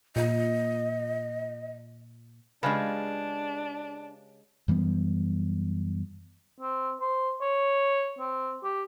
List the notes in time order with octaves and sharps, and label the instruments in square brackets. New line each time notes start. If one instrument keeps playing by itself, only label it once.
[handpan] A#2 [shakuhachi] D#5
[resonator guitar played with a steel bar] C#3 F4 G#4 [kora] G#3 G4 B4 [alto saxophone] D4
[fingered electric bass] F#2 E3 G3 B3
[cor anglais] C4
C5
C#5
C4
G4